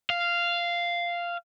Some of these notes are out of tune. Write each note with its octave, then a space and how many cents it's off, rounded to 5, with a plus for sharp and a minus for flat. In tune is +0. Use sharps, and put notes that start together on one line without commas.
F5 -10